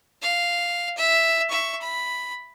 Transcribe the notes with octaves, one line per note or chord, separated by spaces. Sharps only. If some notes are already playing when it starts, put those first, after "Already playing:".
F5
E5
E5 C#6
B5